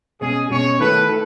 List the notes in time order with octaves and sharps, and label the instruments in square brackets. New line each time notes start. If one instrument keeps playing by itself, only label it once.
[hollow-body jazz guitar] B2 G#3 C#4 [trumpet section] G#4
[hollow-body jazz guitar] B2 G#3 C#4 [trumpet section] C#5
[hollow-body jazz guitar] D#3 A3 E4 A4 [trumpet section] B4
[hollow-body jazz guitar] A3 E4 A4